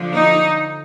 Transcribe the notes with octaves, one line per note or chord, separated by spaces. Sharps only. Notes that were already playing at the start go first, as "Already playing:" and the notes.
Already playing: D3 F3
D#4